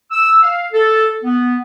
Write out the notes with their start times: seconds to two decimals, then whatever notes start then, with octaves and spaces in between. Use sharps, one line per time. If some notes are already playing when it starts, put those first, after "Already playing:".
0.11 E6
0.42 F5
0.72 A4
1.24 B3